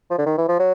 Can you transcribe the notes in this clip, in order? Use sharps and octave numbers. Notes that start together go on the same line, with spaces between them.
F3
D3
D#3
E3
F3
F#3